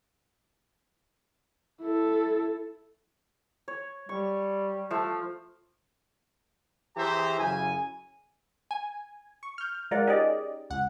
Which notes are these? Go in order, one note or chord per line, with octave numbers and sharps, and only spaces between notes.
E4 A4
C#5
G3 C#6
F3 A3
E3 G4 G#4 C5 E5 A#5
F#2 C#3 E4 G#5
G#5
C#6
F6 G6
G#3 F4 A#4 D5 F#5
C#4 D#4 G4 G#4 D5 D#5
C#2 F#5